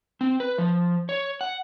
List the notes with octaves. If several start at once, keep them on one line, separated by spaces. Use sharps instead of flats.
C4
B4
F3
C#5
F#5